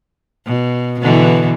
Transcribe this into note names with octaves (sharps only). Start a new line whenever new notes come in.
B2
B2 D3 E3